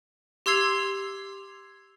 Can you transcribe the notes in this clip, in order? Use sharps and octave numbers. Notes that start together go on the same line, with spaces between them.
G4 C6 E6 G#6 C7 F7